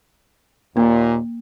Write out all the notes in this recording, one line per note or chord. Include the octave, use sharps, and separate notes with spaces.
D#2 A#2 A#3